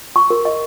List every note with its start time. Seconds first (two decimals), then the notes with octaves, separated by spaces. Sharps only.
0.16 C#6
0.30 A#4
0.45 D#5